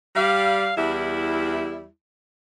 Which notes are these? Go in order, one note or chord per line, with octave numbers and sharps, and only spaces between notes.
G3 F5
E2 G3 E4